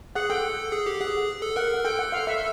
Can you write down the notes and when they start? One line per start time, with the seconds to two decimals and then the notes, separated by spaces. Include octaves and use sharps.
0.15 G#4 F#5
0.30 A4 G5
0.72 G#4
0.86 G4
1.00 G#4 F#5
1.42 A4
1.56 A#4 F#5
1.84 A4 G5
1.99 F#5
2.12 F5
2.27 E5